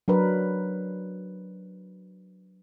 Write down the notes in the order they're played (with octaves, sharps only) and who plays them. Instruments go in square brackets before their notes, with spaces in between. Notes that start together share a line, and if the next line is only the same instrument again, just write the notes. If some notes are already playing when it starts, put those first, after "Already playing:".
[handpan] F#3 D4 A#4 B4